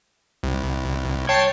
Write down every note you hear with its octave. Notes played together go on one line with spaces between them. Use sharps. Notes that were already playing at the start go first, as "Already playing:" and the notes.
C2
C#5 G5 A5 C7